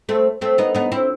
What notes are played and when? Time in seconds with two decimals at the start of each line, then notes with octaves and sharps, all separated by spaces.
0.09 A3 C4
0.41 A3 C4
0.58 B3 D#4
0.75 B3 D#4
0.92 C4 E4